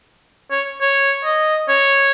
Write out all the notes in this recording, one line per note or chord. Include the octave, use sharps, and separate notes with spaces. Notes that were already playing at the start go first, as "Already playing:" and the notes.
C#5
C#5
D#5
C#5